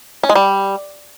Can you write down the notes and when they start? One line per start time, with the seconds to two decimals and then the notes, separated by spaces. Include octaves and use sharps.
0.23 C#4
0.29 G#3
0.35 G3